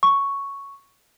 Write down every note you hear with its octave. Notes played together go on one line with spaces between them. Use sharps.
C#6